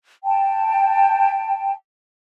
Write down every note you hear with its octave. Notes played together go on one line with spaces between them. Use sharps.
G5 A5